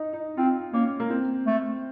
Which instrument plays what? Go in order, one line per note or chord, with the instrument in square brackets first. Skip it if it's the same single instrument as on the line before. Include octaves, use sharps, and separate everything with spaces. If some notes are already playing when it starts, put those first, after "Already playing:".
Already playing: [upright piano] D#4
D#4
[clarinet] C4 [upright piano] F4
[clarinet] A#3 [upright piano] C#4
[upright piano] A#3
C4
[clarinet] A3